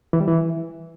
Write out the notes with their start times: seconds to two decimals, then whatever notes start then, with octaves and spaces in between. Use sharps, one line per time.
0.13 E3
0.21 G3
0.28 E3